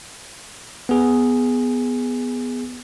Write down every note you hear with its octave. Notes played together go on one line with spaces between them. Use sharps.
B3 G#4